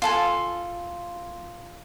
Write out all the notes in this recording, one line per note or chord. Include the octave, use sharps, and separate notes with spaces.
F4 A4 G#5